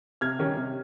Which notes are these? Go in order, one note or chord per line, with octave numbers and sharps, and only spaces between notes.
C3 F6 G#6
D#3 G3 C#4
C3